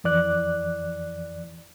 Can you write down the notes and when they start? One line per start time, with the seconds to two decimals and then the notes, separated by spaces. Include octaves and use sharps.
0.04 F2 E3 D5 F#6